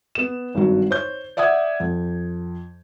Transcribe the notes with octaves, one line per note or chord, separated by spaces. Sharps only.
B3 E7
G#1 G2 F#3
C5 C#5 G6
D5 E5 F#5 D#6 G#6
F2